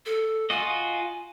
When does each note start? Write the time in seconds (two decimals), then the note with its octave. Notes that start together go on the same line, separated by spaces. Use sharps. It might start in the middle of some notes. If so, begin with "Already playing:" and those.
0.06 A4
0.50 F4 F#4 D#5 G#5